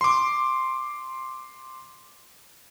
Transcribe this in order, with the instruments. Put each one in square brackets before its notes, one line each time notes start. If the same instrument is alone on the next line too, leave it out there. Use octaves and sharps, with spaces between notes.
[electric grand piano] C6 D6